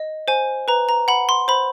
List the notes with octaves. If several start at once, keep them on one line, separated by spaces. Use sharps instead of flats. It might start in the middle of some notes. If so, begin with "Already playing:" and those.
Already playing: D#5
C5 G#5
B4 A#5
A#5
F#5 B5
C6
C5 B5